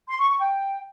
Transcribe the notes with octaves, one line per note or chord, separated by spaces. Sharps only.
C6
C#6
C#6
G5